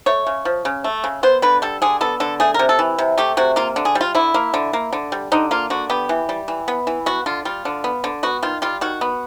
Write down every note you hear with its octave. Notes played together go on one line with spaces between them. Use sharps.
A3 C#5
C#3
F3
C#3
A3
C#3
B3 C5
D3 B4
G3 A4
D3 G#4
B3 A4
D3 A4
A3 G#4
C3 A#4
A4
E3
C3
A3 G4
C3 F#4
A#3 F4
D3
G#4
G3
F4
D3 E4
A#3
D3
A#3
D3
G3
D3 D#4
A#3 F4
D3 F#4
B3 G4
E3
G3
E3
B3
E3
B3 F#4
D3 F4
G3 F4
D3
B3
D3
B3 F#4
D#3 F4
G3 F4
D#3 F#4
B3